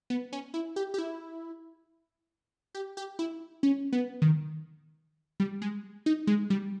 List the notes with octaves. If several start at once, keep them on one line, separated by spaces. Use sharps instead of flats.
B3
C#4
E4
G4
G4
E4
G4
G4
E4
C#4
B3
D#3
G3
G#3
D#4
G#3
G3